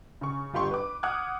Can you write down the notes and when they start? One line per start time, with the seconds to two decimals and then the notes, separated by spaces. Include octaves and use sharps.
0.21 C#3 C#6
0.54 G1 F4 G4 C6 C#6
0.71 B4 D6
1.03 F#5 D6 D#6 F6 F#6 G#6